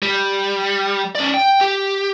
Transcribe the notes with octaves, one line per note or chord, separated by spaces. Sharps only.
G3
C#4 D5
G5
G4